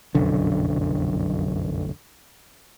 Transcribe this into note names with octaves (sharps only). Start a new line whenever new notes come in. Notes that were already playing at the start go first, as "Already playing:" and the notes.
F1 B1 F#2 D3